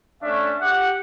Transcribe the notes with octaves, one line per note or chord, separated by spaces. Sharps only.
A3 C#4 D4 E5
G4 F#5